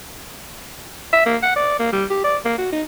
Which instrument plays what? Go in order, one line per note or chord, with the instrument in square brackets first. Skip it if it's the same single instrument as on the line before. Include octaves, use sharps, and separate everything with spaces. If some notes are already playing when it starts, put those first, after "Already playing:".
[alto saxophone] E5
A#3
F#5
D5
A#3
G3
G4
D5
A#3
F#4
D#4